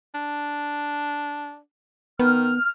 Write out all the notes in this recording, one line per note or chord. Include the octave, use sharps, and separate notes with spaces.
D4
D#3 B3 F6